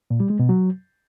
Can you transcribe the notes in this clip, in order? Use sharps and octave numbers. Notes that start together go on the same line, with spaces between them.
A#2
G3
G#3
B2
F#3